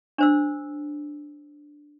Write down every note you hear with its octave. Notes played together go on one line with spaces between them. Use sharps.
D4 C5 E6